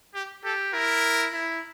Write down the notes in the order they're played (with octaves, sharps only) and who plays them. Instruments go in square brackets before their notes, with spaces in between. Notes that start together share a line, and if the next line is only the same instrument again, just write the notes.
[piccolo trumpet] G4
[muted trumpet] G4 [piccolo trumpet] A4
[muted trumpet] E4 [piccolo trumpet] A#4
[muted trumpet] E4